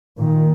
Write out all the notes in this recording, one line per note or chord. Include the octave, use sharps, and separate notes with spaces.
A#2 D#3